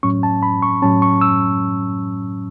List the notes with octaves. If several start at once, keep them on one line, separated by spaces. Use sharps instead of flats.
A2 F#3 C#4 C#6
A5
B5
C#6
A2 F#3 C#4 A5
C#6
E6